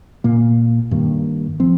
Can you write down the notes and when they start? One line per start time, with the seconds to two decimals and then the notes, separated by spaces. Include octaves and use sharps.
0.24 A#2 A#3
0.91 G2 D#3 A#3
1.60 F3 C4